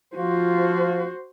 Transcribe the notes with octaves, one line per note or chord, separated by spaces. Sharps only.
F3 F4 F#4 C5